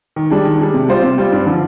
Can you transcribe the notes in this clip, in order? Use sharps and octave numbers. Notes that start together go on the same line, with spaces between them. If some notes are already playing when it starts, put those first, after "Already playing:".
D#3
G3 D4 G#4
D#3
G3 D4 G#4
C3
G3 C4 F4 C5
C3
G3 C4 F4 C5
G2
D3 F3